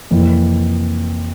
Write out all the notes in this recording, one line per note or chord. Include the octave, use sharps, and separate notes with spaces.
F2 C3 E3 A#3